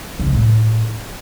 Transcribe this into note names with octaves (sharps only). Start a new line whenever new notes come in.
C#3
G#3
A2